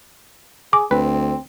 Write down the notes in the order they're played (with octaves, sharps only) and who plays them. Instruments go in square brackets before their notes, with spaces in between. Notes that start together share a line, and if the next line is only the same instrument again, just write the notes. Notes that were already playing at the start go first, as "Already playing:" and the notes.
[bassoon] G#4 [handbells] D6
[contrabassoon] D2 [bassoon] C4 [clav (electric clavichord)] B4